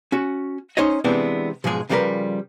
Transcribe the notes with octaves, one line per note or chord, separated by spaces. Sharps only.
C#4 F#4
C#4 D#4 C5 C#5 D#5
C3 E3 G#3 B3 C4 D4
B1 G#2 F3 G#3 G#4
C#3 F3 G3 C#4 A#4 B4